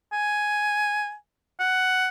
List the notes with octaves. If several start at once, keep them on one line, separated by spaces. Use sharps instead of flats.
G#5
F#5